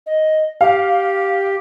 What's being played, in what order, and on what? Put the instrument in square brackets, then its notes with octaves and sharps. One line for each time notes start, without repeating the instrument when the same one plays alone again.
[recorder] D#5
[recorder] G4 [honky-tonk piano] F5